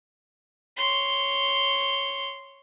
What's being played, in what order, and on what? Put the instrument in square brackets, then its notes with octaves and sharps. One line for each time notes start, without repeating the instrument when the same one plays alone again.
[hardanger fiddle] C#5 C6